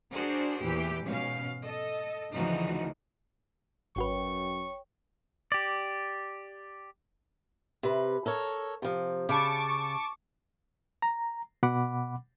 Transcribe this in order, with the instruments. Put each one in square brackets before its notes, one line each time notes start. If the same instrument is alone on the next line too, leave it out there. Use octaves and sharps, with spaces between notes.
[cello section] D4 F#4 G#4 A#4 C5
E2 A#2 E3 G4
G#2 B2 C#4 F5
A4 D#5
D2 C#3 E3 F3 D#4 F#4
[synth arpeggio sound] G#1 F#4 B4 [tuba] F#2 [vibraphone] C#5 G5 [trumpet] C#6
[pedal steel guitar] G4 D5
[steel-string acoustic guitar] C3 B4
A4 A#4 C#5
C3 F3
[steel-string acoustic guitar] C#3 [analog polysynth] A5 C#6 D6
[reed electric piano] A#5
B2 F#5 B5 D6